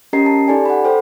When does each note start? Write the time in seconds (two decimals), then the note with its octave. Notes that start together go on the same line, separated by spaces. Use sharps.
0.13 C#4 G4 A#4 D#5 A#5 C7
0.26 A5
0.48 D#4 G4 A4 D5 G#5
0.65 F#5 B5
0.85 A4 C5 G5